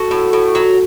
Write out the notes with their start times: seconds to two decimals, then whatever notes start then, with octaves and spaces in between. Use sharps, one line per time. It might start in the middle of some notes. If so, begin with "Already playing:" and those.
Already playing: F#4 A4
0.11 A2
0.33 A2
0.55 F#3